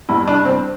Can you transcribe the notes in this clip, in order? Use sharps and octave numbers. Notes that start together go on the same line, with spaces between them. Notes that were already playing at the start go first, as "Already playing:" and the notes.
G2 E3 G3 E4
D4
C4